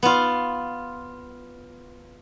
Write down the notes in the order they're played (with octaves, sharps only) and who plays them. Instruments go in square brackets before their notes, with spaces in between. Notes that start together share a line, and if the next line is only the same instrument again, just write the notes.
[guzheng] B3 F4